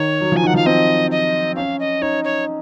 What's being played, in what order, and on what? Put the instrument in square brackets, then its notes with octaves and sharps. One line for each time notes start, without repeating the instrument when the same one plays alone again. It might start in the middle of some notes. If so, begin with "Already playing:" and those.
Already playing: [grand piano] D#3 [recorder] C#5
[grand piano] F#3
[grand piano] F3 [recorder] G#5
[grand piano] D#3 [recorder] F#5
[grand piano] F3 [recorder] F5
[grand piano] C4 [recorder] D#5
[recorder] D#5
[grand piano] C#4 [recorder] F5
[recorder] D#5
[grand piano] D#4 [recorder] C#5
[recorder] C#5